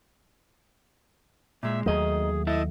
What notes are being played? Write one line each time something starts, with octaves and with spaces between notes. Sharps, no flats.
A#2 G#3 E5
D#2 D#3 F#3 A3 G#4 D#5
E4 A4 D#5 E5